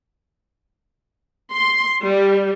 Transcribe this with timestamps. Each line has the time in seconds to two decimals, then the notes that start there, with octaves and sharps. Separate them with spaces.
1.52 C6
2.03 G3